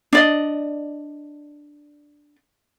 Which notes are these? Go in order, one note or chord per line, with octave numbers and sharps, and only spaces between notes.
D4 D5 D#5